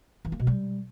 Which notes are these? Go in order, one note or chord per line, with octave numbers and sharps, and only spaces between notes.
E3
A#3
B2
G3